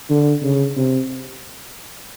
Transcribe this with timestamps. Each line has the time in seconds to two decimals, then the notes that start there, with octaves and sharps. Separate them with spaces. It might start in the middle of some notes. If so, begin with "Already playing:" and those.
0.10 D3
0.43 C#3
0.77 C3